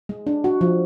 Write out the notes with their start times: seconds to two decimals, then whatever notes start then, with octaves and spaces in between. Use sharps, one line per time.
0.09 G#3
0.27 D4
0.44 F#4
0.61 F3